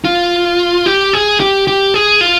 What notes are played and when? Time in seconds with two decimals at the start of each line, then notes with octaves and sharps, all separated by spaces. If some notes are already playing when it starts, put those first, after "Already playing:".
0.05 F4
0.86 G4
1.13 G#4
1.40 G4
1.68 G4
1.94 G#4
2.21 F4